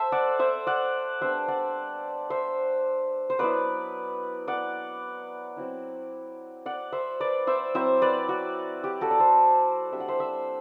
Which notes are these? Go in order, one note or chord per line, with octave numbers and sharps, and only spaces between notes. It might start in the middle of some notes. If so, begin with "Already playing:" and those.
Already playing: A4 C5 E5
D5 F#5
C5 E5
D5 F#5
G3 B3 D4 C5 E5
D5 F#5
C5 E5
C5
F#3 B3 E4 B4 D5
D5 F#5
F#3 C4 E4
D5 F#5
C5 E5
B4 D5
C5 E5
F#3 C4 E4 C5 E5
B4 D5
F#4
G4
F#4 A4
D5
A4 C5
G3 D4 E5
F#5
C5 E5
C5 E5